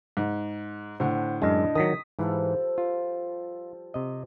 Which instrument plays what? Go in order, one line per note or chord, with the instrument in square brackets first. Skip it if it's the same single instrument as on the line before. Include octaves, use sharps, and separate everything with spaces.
[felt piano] G#2
[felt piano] A2 D3 [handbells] C5 F#5
[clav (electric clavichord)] F#2 G#3 [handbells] D4 D#5
[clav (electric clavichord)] D#3 F#3 [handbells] D#6 B6
[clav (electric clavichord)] G#2 E3 [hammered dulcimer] F3 G3 A4
[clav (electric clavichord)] F4
C3 D#5